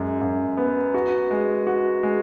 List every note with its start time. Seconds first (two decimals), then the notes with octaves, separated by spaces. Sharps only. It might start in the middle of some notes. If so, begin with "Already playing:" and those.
Already playing: F#2 G#3
0.21 F#2
0.57 B3
0.94 F#4
1.31 G#3
1.67 F#4
2.03 G#3